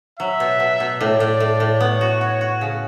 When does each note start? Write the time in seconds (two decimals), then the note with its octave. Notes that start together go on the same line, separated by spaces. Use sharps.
0.19 F#3 E5
0.40 B2
0.60 B2
0.80 B2
1.00 A2 D5
1.20 A2
1.40 A2
1.60 A2
1.80 B3 C#5
2.01 F#4
2.21 F#4
2.41 F#4
2.61 C#3